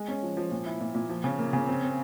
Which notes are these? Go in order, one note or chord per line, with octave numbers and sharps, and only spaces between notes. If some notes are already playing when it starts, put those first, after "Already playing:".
Already playing: G#3
C#4
F3
F3
A#2
E4
A#2
A#2
F3
C#3
A#3
C#3
C4
C4